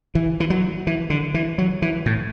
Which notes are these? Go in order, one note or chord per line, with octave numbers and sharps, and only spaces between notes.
E3
E3
F#3
E3
D3
E3
F#3
E3
A2